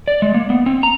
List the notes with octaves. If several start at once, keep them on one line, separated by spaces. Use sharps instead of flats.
D5
G#3
A#3
B3
C4
A#5